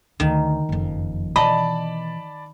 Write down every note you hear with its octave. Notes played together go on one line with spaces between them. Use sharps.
D2 D#3
F#1 F2
B2 E3 D5 D#5 A5 B5